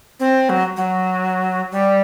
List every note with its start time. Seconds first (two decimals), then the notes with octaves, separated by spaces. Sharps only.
0.20 C4
0.49 F#3
0.77 F#3
1.71 G3